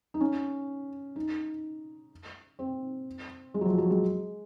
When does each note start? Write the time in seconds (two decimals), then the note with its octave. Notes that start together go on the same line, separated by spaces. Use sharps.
0.14 D#4
0.20 C#4
1.16 D#4
2.59 C4
3.54 G#3
3.61 F#3
3.65 F3
3.78 F#3
3.90 G#3